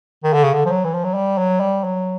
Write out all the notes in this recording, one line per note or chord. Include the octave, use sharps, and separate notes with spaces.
D#3
D3
C#3
D3
F3
F#3
E3
F3
F#3
G3
F#3
G3
F#3